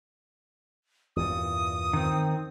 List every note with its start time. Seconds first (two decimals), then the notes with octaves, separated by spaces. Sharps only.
1.16 E2 G2 A#2 D#6
1.93 D#3 C4